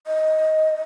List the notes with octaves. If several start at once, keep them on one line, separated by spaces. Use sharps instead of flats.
D#5